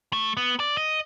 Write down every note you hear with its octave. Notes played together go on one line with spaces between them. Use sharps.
A3
B3
D5
D#5